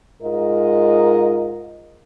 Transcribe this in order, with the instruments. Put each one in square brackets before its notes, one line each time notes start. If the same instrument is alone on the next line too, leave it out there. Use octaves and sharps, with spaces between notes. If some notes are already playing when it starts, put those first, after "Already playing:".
[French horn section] G#2 G#3 F4 A#4 D#5